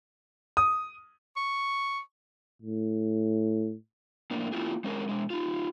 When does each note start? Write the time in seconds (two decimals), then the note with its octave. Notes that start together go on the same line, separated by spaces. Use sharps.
0.57 D#6
1.37 C#6
2.62 A2
4.31 A2 A#3 D4
4.52 A#3 C#4 E4 F4 G4 G#4
4.84 G#3 C#4 G#4 A#4
5.09 B2 G#3
5.30 D#4 F4